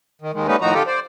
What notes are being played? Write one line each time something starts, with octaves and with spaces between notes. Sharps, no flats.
D#3
D#2 D#3 G#3
G3 A3 B3 C#4 D#4 B4
A2 D#3 F3 D#4 F#4 A#5
D3 F4 G4 A4
C5 D5